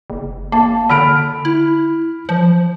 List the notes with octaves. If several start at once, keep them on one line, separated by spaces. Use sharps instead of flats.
F#1
A#3 A5
D3 B5 F6 D7
E4
F3